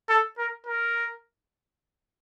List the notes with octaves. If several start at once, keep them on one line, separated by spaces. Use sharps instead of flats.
A4
A#4
A#4